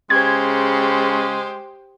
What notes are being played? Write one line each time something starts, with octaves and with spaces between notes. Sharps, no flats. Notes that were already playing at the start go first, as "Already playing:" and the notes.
C#3 G#3 G4 C5 G#6